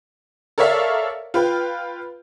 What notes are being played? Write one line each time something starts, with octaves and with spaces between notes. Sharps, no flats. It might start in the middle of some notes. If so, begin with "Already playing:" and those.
A4 A#4 C#5 D5 E5 F5
F4 B4 G5